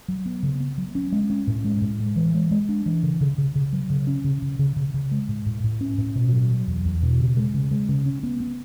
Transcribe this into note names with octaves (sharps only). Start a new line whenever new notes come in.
F#3
B3
C#3
B3
F#3
C#4
G#3
C#4
A2
G#3
A2
G#3
E3
G#3
G#3
D4
E3
C#3
C#3
C#3
C#3
F#3
C#3
C#4
C#3
C#3
C#3
C#3
C#3
G#3
A2
A2
A2
C#4
A2
B2
F#3
F#3
E2
E2
B2
C#3
G#3
C#3
G#3
C#3
C#4
B3
B3